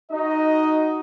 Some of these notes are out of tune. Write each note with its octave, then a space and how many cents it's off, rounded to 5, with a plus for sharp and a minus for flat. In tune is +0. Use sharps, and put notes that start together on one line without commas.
D#4 +0 F#4 +0 D#5 +10